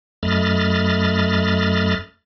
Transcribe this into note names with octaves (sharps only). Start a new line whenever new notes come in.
F#2 A3 D#5 B5 F6 A6